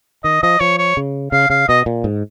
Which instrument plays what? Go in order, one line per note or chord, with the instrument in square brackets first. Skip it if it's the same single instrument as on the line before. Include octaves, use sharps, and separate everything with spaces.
[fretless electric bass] D#3 [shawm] D#5
[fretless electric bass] F3 [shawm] D#5
[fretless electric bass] F3 [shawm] C#5
[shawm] C#5
[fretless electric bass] C#3
[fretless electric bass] C#3 [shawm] F5
[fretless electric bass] C#3 [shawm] F5
[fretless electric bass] B2 [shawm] D#5
[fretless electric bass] A#2
G#2